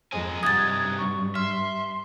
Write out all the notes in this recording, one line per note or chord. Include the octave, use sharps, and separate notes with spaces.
F2 G#3 G#4 A#4 G#5
G2 C3 D#4 F#4 D#6 G#6 A6
C#6
E5 C6 F6